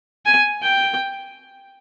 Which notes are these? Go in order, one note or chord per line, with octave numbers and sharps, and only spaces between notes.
G#5
G5